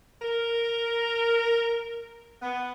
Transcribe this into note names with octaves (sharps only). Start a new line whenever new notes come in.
A#4
B3